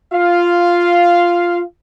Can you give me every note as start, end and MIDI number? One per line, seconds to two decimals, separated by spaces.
0.14 1.62 65
0.14 1.62 77